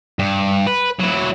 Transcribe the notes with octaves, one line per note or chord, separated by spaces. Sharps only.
G2
B4
F#3 E4